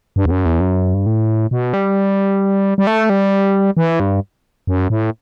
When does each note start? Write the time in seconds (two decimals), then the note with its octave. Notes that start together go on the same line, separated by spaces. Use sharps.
0.16 G2
0.26 E2
0.31 F#2
0.46 E2
0.60 F#2
0.94 G2
1.06 A2
1.51 B2
1.73 G3
2.78 G3
2.87 A3
3.10 G3
3.77 E3
4.00 G2
4.67 F#2
4.90 A2